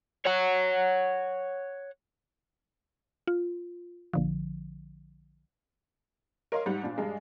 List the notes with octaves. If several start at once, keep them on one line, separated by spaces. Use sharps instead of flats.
C#5 F#5
F4
A#1 D3 F3
A#4 C#5 D#5 F5 C6
G#2 G3 F#5
A#2 D4
G2 G#3 D4